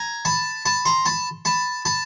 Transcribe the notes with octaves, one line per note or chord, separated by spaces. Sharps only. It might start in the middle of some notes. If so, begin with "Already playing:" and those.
Already playing: G#5 A#5
A5 B5
A5 B5
A#5 C6
A5 B5
A5 B5
A5 B5